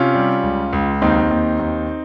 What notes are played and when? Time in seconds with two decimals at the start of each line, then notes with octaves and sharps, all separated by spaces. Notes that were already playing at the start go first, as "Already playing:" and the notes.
Already playing: C3 C#4 F4
0.14 G3
0.43 C#2
0.73 C#2
1.02 D#2 C4 D#4
1.31 D#2
1.59 D#2